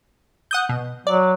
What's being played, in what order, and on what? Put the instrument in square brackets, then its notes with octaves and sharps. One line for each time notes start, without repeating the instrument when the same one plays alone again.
[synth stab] F#5 D#6 G6
B2
[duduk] F#3 [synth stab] D5